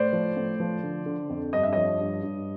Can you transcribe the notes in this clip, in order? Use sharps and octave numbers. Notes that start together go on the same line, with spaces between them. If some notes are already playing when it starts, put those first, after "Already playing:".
Already playing: A2 C5 D5
F3
A2
F3
D3
D3
F2
G2 D#5
E5
F3 C#5 D#5
G2
G2